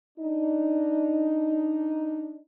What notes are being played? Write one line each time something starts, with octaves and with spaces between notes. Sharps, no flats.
D4 D#4